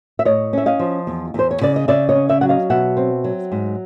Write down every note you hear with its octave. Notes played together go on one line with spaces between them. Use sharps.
E5
A2 C#5 D#5
C#4 E5
D#5 F5
F3
E2
E2 C5
C#5
C#3 D5
D#5
C#3 D5 E5
C#5 D#5
C#4
D5 E5
F#3 F#5
D#5 F5
B2 E5 F#5
C4
F#3
G#2